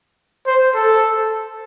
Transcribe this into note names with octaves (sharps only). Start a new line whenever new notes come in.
C5
A4